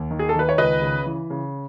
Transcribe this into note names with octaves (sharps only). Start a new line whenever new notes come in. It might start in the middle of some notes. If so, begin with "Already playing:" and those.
Already playing: D#2
D#3
G#4
A4
D#3 B4
C#5
C#2 B4 D#5
C#3
E3
C#3